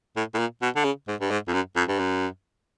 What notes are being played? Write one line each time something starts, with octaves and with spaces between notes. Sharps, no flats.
A2
A2
A#2
B2
D3
C#3
G#2
G2
G#2
F2
F#2
F2
G2
F#2